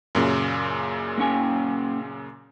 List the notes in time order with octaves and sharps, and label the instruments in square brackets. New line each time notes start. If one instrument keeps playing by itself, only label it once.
[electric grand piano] F#2 A#2 C#3
[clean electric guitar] A#3 C#4 G#5